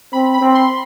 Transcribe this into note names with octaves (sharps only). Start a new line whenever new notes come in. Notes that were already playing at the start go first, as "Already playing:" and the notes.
C4 B5
B5
C4
C6